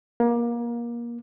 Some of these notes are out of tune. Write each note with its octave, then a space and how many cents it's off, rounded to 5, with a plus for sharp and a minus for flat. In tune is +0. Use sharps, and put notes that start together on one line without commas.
A#3 +25